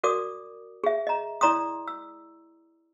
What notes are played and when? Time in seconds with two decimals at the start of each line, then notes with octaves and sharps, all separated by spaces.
0.04 F#4 A#4 D5 D6 D#6
0.84 G#4 E5
1.07 D#5 A#5
1.41 E4 D5 A#5 C6 D#6
1.88 E6